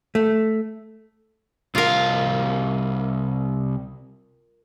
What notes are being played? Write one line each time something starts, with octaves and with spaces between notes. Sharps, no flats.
A3
C2 F4 A#4 F5